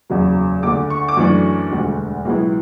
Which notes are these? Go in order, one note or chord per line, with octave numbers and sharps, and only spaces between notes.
F#1 E2 C#3 F#3
D2 D3 A3 D6
C#6
D6
F#2 E3 A3 D4 C#6
E1 D2 D3 G3
C#2 B2 F#3 B3 E4